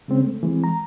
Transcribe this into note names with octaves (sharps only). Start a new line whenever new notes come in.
C#3 G#3 C4 C#4
A3
E3 G#3 C4
A#5